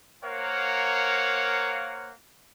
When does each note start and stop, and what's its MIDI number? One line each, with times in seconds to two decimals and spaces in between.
0.23 2.10 58
0.23 2.10 70
0.23 2.10 72
0.23 2.10 73
0.23 2.10 77
0.23 2.10 78